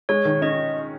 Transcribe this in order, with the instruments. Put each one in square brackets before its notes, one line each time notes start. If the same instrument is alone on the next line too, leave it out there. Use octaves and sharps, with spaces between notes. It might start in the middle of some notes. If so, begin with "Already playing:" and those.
[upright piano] G#3 [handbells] C#5
[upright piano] D#3
[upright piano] C#4 [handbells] D#5